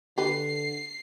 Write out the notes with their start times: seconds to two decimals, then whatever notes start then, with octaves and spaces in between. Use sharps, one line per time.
0.18 D3 G4 B4 C7